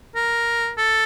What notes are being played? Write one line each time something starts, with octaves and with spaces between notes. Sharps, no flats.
A#4
A4